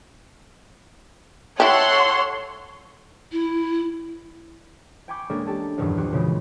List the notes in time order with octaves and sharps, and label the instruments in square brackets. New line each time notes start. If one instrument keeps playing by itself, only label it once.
[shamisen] E4 G4 [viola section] A4 F#5 C6 [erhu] C#5
[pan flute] E4
[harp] G5 G#5 B5 C#6 D6 G6
G#3 A#3 C#4 D4 A4 G#5
G4 A4 A5
A#1 E2 G2 D#3 F3 F#3
F#4 G4 C6
A#2 C#3 E3 F3 G#3